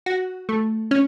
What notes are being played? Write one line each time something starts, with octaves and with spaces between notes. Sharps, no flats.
F#4
A3
C#4